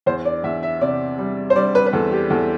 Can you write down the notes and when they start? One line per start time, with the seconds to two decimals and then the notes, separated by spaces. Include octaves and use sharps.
0.06 E2 C5
0.25 D5
0.44 E2 E5
0.63 E5
0.81 C3 D5
1.19 G3
1.50 C5
1.56 G3 D5
1.75 B4
1.86 B4
1.93 E2 A4
2.11 G4
2.30 E2 A4